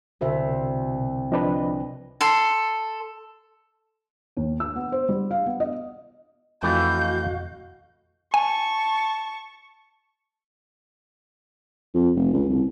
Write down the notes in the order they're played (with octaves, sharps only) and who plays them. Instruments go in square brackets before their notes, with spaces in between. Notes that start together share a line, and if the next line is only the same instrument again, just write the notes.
[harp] C2 [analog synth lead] B2 [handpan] D3 C5 E5
[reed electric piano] F3 D4 B4 [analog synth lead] D#5
[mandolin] A4 C6
[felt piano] D#2
E6
B3
C5
G3
F5
B3
D#5
[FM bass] F2 [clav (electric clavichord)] E3 A3 G5 [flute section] F#4 D#5 F5 [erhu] G6
[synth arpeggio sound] G#5 [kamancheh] A5 C#6
[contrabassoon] F2
F1
C#2
C2